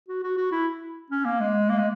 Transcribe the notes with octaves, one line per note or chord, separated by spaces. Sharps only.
F#4
F#4
F#4
E4
C#4
A#3
G#3
A#3
G#3